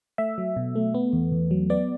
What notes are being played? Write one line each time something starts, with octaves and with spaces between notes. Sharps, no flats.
A3 E5
F#3
B2
A3
B3
E2
E2
F#3
B3 D5